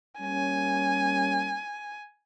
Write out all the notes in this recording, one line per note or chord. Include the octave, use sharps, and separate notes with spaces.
G3 A#3 C#4 G#5